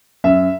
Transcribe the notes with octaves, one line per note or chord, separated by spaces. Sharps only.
F#2 E5